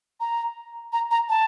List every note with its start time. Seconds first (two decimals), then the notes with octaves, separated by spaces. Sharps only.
0.20 A#5
0.93 A#5
1.11 A#5
1.29 A5